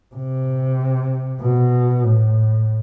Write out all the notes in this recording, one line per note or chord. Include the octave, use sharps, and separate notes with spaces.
C3
B2
A2